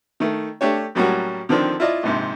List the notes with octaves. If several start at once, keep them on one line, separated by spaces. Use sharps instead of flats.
D#3 A3
A3 D4 G4 C#5
A2 F#3 G3 A#3 C#4 F#4
D3 D#3 F3 C4 D4
E4 F4 D5 D#5
A#1 G#2 C3